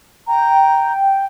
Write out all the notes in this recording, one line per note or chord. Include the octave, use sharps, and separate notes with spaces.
G5 A#5